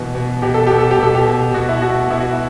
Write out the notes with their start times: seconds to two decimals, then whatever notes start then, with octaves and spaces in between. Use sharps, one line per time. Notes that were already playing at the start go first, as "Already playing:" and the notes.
Already playing: B2 E3
0.15 B2
0.42 B2 G4
0.54 A4
0.67 B2 G4
0.78 A4
0.91 G4
0.99 B2 A4
1.15 G4
1.26 B2
1.54 B2 F#4
1.69 E4
1.82 B2 F#4
1.96 F#4
2.10 B2 E4
2.20 F#4
2.31 E4